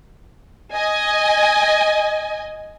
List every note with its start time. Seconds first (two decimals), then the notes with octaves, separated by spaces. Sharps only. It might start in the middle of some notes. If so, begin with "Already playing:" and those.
0.73 D#5 G#5